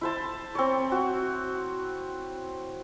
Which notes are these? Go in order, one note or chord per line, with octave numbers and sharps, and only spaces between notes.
E4 C5 A5
C4 C#5
F#4